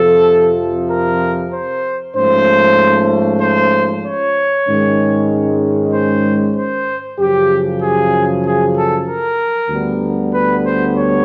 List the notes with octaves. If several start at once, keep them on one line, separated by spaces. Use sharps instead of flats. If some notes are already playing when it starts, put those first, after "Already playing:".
Already playing: F2 C3 F3 A4
A#4
C5
G#2 F3 A3 C#4 C5
C5
C#5
G#2 D#3 G#3 C#4
C5
C5
F#2 C#3 F3 G4
G#4
G#4
A4
A#4
D2 D3 G3 B3
B4
C5
C#5